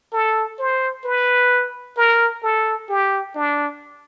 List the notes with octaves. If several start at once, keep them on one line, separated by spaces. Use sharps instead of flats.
A4
C5
B4
A#4
A4
G4
D4